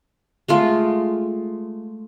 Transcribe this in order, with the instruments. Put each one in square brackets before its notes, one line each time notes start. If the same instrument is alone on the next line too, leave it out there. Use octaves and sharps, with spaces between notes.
[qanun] G#3 A3 F4